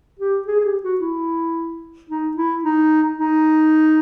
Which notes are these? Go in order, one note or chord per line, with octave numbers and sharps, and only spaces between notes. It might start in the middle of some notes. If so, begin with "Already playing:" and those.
G4
G#4
G#4
G4
F#4
E4
D#4
E4
D#4
D#4